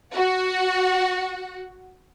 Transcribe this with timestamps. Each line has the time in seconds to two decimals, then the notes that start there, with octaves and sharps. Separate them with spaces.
0.14 F#4 F#5